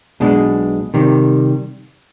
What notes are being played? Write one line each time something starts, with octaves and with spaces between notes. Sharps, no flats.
B1 B2 G#3 D4
C3 D#3 G3